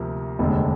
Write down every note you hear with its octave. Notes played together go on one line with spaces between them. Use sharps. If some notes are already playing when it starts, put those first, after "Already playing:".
Already playing: D2 C3 F3 A#3
F1 D#2 D3 G#3